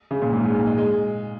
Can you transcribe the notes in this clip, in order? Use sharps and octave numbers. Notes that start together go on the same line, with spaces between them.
C#3
A#2
G#2
G#2
A#2
G#3
G#3